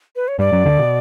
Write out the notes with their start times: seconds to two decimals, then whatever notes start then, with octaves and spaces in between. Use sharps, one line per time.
0.16 B4
0.28 C#5
0.39 G2 G3 D5
0.52 F#2 F#3
0.65 D2 D3
0.79 B2